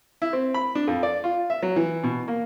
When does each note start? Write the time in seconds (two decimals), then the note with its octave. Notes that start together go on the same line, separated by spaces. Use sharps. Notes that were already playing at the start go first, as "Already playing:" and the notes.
0.22 E4
0.33 C4
0.54 B5
0.75 D4
0.87 F2
1.03 D5
1.24 F4
1.50 E5
1.62 F#3
1.76 E3
2.04 B2
2.28 A#3